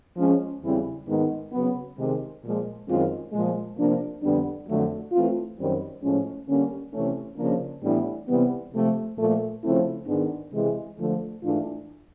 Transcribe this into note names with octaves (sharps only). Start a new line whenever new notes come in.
F3 G#3 C#4
E2 C#3 E3 G3 C4
G#2 D#3 G#3 B3 D#4
C#3 F#3 B3
C3 D#3 G#3
A#2 F3 G#3
F#2 D#3 G#3 C4 F4
A#2 F3 G#3
C3 F3 A#3 D4
F2 D3 G3 B3 D4
F2 D3 F#3 A3
E3 A3 C4 F4
F#2 D#3 G3 C4
A2 F3 G#3 C#4
D3 G3 A#3 C#4
C3 E3 A3 C#4
C#3 F3 A#3 D4
A2 E3 G3 B3 D4
C3 E3 G3 B3
C3 F3 A3
A#2 F3 A3
C#3 F3 A3 C4 E4
G#2 D#3 G#3 B3 D4
C3 E3 G#3
D3 F3 A3
G#2 E3 A3 D4 F4